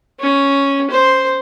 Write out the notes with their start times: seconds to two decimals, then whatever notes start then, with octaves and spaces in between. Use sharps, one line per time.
0.20 C#4
0.91 C5